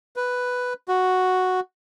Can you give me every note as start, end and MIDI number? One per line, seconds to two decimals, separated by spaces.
0.16 0.73 71
0.88 1.60 66